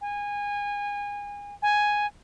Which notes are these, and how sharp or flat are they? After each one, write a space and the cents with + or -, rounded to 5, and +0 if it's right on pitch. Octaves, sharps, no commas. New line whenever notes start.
G#5 -25
G#5 +0